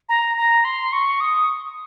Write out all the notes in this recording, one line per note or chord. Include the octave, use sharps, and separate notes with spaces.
A#5
A#5
C6
C#6
D#6